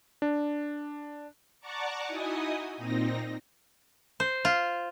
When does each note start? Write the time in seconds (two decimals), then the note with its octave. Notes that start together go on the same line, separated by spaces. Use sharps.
0.22 D4
1.60 D5 F#5 A5 A#5 C#6 D6
2.07 D#4 E4 F#4 D#5 G#5 D#6
2.77 A#2 C4 D#4 A#6
4.20 C5
4.45 F4